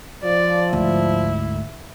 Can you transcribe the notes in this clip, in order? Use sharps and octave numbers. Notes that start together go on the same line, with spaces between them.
F3 D5
D2 G#2 E4